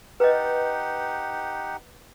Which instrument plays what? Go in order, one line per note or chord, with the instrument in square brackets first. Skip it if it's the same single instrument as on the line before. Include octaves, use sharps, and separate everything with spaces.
[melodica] D#4 G4 F#5 [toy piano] B4 D#5